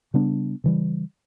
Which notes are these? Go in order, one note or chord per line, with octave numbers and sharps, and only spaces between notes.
C#3 G3 B3 D4
C#3 E3 G3